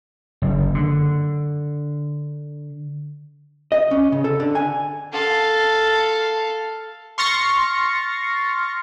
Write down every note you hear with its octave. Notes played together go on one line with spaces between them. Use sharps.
F#1
D3
D#5
C#4
C#3
A4
D3
G#5
A4 F5
C6 C#6 F6 A6 A#6 C#7